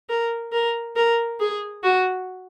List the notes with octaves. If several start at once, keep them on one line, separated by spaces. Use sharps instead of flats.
A#4
A#4
A#4
G#4
F#4